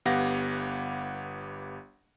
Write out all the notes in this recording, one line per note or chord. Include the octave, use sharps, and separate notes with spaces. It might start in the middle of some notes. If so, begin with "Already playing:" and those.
G1 B3 G4 F5 F#5 A#6